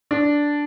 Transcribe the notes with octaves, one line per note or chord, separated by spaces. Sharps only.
D4